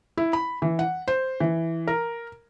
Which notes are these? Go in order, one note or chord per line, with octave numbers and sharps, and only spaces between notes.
E4
B5
E3
F#5
C5
E3
A#4